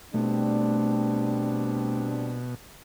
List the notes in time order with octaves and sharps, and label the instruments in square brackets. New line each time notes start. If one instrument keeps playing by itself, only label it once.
[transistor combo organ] B2 [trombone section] G3 C4 D4 [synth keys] A3